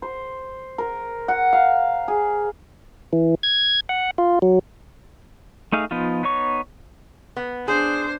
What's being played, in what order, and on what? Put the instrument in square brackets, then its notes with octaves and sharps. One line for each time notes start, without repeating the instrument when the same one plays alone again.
[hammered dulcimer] C5
A#4
F#5
F5
G#4
[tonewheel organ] E3
G#6
F#5
F4
F#3
[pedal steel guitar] A3 D#4 G#4 F5
F3 B3 D#4 F4
B3 D#4 C#5 C#6
[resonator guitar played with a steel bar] B3
[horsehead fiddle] D4 [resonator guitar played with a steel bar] G#4 [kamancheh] C5